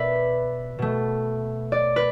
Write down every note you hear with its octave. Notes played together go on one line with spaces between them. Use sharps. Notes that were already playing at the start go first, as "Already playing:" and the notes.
Already playing: B2 B3 B4 D5 E5
B2 A3
D5
B4